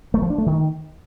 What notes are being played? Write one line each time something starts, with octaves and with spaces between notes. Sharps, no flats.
A3
F3
D4
A3
D#3